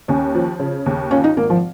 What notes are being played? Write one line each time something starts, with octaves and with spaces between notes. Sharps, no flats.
D#2 C#4
F3
C#3
D#2
C#4 F4
D#4
G#1 A#3
F3